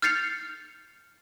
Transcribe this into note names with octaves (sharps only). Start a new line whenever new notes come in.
F6 G6 A6 C7 C#7 F7